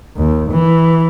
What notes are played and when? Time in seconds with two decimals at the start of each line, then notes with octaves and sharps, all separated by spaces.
0.17 D#2
0.52 E3